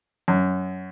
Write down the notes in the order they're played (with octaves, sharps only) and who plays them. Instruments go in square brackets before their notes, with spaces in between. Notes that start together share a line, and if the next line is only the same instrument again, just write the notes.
[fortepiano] F#2